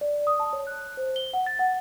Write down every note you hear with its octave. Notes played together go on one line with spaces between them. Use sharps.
D5
D#6
A5
C#5
F#6
C5
G7
F#5
A6
F#5